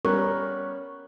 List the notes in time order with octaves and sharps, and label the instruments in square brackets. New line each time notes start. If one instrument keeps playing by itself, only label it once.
[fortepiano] G3 B3 C#4 [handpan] A#4 [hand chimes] C#6 F#6